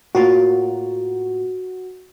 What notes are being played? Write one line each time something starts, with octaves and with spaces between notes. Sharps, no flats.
A2 A#3 F4 F#4